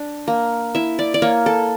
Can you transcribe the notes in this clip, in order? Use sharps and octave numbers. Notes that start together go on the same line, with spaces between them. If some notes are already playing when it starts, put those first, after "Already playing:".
Already playing: D4
A#3
E4 E5
D5
D5
A#3 C#5
A4